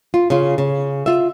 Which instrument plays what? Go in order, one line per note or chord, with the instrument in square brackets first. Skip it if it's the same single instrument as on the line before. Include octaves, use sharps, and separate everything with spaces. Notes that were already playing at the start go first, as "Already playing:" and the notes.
[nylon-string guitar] F4
C#3 F4
C#3
F4 E5